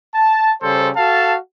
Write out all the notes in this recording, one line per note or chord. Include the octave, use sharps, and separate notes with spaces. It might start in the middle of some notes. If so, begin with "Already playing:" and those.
A5
C#3 G3 A4 C5
F#4 A4 F5 A5